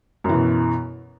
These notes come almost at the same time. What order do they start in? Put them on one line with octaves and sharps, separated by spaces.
F#2 E3 B2